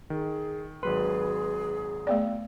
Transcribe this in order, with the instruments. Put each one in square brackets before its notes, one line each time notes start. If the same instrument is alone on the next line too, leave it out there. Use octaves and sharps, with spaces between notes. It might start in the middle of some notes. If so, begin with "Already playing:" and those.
[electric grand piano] D#3 [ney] G#4
[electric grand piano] G#1 F#3 C6 [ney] G#4 [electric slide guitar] B4
[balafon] A3 B3 D5